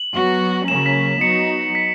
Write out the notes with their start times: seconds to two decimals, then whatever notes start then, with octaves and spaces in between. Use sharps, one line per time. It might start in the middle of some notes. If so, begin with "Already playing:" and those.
Already playing: F#7
0.15 F#3 B3 F#4
0.68 C#3 F#3 A#3 C#4 E7
0.86 B6
1.21 F#3 B3 D#4 F#4 C#7
1.75 B6